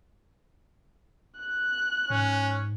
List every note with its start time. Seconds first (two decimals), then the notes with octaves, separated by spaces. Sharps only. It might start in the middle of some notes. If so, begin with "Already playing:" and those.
1.40 F#6
2.10 G#2 C#4